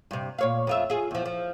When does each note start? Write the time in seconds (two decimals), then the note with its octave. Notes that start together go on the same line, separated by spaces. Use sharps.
0.11 G2 C3
0.38 A#2 C#5 F5
0.67 F2 F4 E5
0.90 F4 G#4
1.11 E2 F3
1.26 F3